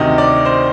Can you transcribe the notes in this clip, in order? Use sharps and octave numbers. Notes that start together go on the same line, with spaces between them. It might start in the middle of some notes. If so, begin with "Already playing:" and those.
Already playing: D2 C3 D#3 D#5
D5
C5